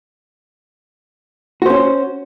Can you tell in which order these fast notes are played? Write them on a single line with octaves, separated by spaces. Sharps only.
F#4 C5 C#4